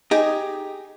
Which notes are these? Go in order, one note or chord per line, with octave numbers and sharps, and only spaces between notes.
D#4 G4 G#4